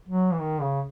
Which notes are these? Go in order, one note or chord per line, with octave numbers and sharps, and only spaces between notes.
F#3
E3
D#3
C#3